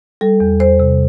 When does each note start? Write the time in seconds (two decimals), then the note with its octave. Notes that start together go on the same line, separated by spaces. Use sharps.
0.21 G3 A4
0.40 E2
0.59 E2 C5
0.80 C3